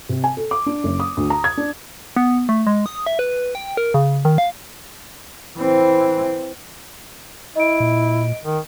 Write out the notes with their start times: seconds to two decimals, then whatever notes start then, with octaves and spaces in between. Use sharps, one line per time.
0.09 C3
0.24 G#5
0.37 A4
0.51 D6
0.66 D4
0.84 F#1
1.00 D#6
1.17 D2
1.30 A#5
1.44 G#6
1.57 D4
2.16 B3
2.49 A3
2.67 G#3
2.86 D#6
3.06 E5
3.19 B4
3.55 G5
3.77 A#4
3.94 C#3
4.25 D#3
4.38 F5
5.57 E3 C4
7.56 E4 D#5 D7
7.80 A#2
8.45 D#3